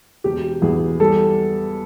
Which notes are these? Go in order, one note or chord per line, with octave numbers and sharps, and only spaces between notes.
E1 G4
E2 G#4
G3 A4